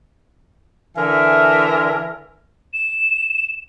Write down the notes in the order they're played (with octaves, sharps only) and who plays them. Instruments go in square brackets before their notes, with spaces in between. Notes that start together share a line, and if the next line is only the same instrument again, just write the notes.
[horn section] D3 E3 A#4 E5 G#5
[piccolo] E7